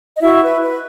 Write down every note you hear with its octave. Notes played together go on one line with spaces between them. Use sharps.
D#5
E4 F#4 E5
B4
B4